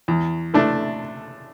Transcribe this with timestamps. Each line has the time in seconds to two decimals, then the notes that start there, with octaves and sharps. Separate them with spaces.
0.08 E2
0.54 E3 A3 D4